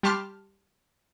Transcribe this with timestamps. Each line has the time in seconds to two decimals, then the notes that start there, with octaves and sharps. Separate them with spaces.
0.03 G3 G4 A5 C6 F6